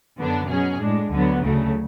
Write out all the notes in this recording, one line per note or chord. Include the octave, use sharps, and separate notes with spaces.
F#2 D3 F#3 B3 D4
B2 F#3 C#4 G#4
A2 G#3 D4
D2 D3 F#3 B3
D2 C#3 F#3 A3